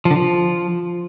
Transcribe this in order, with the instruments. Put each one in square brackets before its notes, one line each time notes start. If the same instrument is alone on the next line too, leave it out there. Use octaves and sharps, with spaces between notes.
[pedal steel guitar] F3
D3
F3